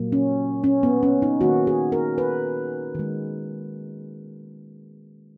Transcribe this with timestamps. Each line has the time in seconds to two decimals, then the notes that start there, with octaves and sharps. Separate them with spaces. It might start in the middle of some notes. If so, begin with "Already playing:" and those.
Already playing: A#2 F#3 A#3
0.12 C#4
0.64 C#4
0.83 B3
1.03 C#4
1.22 D#4
1.41 D#3 A#3 F#4
1.67 G#4
1.92 A#4
2.18 B4
2.95 D#3 G#3